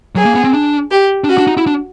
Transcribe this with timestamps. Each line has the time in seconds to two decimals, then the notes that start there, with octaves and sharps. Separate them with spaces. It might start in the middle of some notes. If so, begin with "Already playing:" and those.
0.15 F#3 G#4
0.25 A#3
0.35 B3
0.44 C4
0.53 D4
0.91 G4
1.24 D4
1.29 C#4 F#4
1.38 D4
1.47 D#4
1.57 E4
1.67 D4